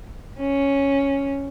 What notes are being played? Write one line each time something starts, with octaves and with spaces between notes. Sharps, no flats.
C#4